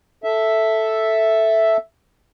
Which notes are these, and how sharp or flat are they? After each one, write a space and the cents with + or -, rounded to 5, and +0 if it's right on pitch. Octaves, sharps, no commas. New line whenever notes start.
A4 +0 E5 +0